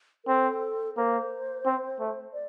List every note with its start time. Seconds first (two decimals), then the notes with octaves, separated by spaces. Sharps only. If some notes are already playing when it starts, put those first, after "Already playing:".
0.24 A#4
0.28 C4 A4
0.97 A#3 C5
1.66 C4
1.99 A3
2.33 D5